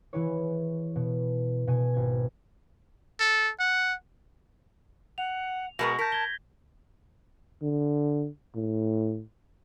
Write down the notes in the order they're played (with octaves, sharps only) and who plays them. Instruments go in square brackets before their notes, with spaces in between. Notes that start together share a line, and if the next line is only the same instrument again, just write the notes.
[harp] E3 E4 G#4 B4 C#5
B2
B2 G#5 D#7
G#1 G#6
[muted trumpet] A4
F#5
[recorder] F#5 [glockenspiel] F7
[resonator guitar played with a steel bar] B2 G#3 B3 [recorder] A#4 [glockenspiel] A#6
[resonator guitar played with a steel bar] A#4 [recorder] A5 [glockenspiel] G6 B6
[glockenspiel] G#6 G7
[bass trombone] D3
A2